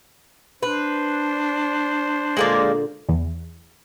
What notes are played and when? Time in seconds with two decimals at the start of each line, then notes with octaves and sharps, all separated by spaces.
0.63 D4 B4 C5
2.37 A#2 D3 G#3 A#3 D5
3.09 E2